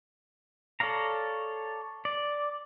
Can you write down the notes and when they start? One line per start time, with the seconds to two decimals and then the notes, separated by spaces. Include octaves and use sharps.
0.80 A4 C#5 D5 F5 A#5
2.05 D5